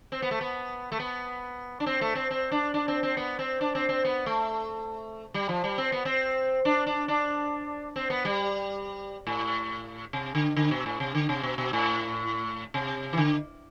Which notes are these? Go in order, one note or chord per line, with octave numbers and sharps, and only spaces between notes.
C4
B3
A3
B3
A3
B3
D4
C4
A3
C4
C4
D4
D4
C4
C4
B3
C4
D4
C4
C4
B3
A3
G3
F3
G3
C4
B3
C4
D4
D4
D4
C4
B3
G3
A2
C3
D3
D3
B2
A2
C3
D3
C3
B2
B2
A2
C3
E3
D3